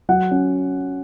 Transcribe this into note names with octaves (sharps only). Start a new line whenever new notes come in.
F#3 F#5
C#4